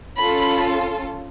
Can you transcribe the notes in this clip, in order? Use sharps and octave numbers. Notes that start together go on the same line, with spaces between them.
C#4 F4 A4 B5